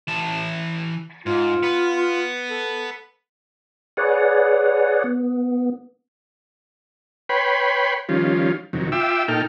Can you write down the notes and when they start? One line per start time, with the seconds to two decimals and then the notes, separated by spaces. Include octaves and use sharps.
0.08 E3 A5
1.26 G#2 F4
1.63 B3
2.50 A4
3.97 G#4 B4 C#5 D5 F#5
5.04 B3
7.29 B4 C#5 G5 B5 C6
8.09 D#3 F3 G3 C#4 F4
8.73 F2 C3 D#3 F#3
8.92 F4 E5 G5 D6 E6
9.28 A#2 D#4 A4 G5 F6